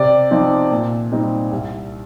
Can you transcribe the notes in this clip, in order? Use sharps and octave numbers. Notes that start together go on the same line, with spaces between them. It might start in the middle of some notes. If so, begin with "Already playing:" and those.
Already playing: C3 D5
F3 C4 D#4
A#2
G3 C4 D#4
C2